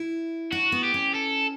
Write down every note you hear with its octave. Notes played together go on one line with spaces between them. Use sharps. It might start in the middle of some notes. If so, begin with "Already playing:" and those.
Already playing: E4
D4 F#4
B3
G4
C#4
A4